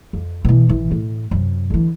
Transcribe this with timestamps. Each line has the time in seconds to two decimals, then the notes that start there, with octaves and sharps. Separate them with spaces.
0.13 F2
0.45 B2 E3
0.69 A1 E3
0.91 A2
1.31 F#2 C3
1.70 D3 E3